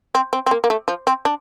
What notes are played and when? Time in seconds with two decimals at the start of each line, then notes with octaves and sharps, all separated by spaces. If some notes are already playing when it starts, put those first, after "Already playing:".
0.15 C4
0.33 C4
0.46 C4
0.51 A#3
0.64 A#3
0.70 A3
0.88 F3
1.07 C4
1.25 D4